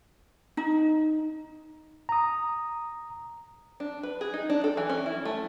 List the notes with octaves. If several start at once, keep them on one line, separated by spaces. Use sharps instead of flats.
D#4
A#5 D#6
D4
B4
G#4
D#4
D4
A4
E3
C#4
E4
A3